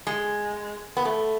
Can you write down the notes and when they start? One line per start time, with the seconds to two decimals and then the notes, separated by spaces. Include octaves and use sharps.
0.07 G#3
0.97 B3
1.05 A3